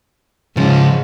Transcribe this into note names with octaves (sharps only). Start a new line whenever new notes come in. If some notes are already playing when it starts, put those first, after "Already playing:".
G#2 C#3 F3 G#3 C#4